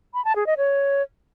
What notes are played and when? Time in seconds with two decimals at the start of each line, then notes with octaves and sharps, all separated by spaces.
0.14 B5
0.25 A5
0.36 G#4
0.47 D#5
0.57 C#5